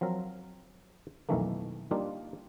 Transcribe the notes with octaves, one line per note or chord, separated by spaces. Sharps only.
F3 F#3 C4 A#4
B1 F2 D#3 E3 A3 A#3
G3 A#3 D4 D#4 F4